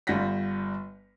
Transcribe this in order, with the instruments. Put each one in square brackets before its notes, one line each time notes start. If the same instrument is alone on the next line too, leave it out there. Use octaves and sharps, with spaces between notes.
[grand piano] G1 G3 F4 F#5 A#6 B6